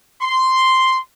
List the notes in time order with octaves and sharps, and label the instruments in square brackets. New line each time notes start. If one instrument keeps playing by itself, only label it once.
[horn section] C6